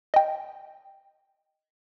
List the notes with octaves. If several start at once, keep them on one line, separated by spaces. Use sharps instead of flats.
D#5 G5